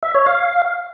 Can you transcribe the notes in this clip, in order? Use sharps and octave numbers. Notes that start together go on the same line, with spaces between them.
E5
C#5
F5